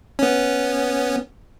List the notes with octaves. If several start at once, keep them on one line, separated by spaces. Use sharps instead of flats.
B3 C#4